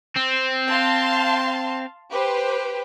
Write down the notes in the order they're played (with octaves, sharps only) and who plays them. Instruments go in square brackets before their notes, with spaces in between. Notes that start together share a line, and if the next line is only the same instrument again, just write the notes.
[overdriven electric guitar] C4
[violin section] F5 A5 C6
G4 B4 C5